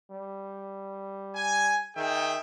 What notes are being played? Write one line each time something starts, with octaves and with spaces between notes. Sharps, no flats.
G3
G#5
D#3 G#4 E5 G5